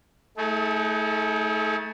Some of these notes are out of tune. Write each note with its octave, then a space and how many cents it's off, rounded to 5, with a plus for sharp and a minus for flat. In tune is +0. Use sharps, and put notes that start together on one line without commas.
A3 +0 D#4 +45 G#4 +25